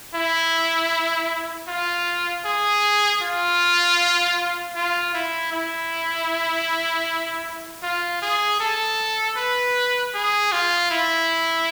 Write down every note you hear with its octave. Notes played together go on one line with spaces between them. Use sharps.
E4
F4
G#4
F4
F4
E4
E4
F4
G#4
A4
B4
G#4
F4
E4